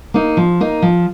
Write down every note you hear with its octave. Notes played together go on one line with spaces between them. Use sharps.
A#3 D#4
F3
A#3 D#4
F3